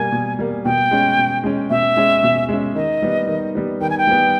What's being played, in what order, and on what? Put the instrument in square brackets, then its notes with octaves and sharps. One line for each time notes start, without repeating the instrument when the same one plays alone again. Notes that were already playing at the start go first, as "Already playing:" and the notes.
Already playing: [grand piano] B2 G3 A#3 [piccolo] G#5
[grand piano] B2
G3 A#3
[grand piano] B2 [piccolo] G5
[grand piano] G#3 C#4
B2
G#3 C#4
[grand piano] B2 [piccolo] E5
[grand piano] G#3 C#4
B2
G#3 C#4
[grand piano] D#3 [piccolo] D#5
[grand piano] G3 B3
D#3
G3 B3
[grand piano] D#3 [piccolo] G5
[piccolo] G#5
G5
[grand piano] G3 B3